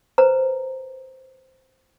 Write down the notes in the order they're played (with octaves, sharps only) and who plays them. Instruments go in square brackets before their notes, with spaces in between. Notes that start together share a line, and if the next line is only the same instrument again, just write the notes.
[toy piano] B4 C5 A#5